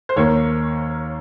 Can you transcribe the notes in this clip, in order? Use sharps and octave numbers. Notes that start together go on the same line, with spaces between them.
C5
D#2 D#3 A#3 C#5